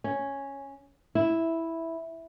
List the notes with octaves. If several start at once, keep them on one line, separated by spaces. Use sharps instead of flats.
C#4
E4